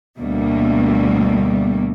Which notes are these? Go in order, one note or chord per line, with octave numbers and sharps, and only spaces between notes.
D2 B2 G3 A3 A#3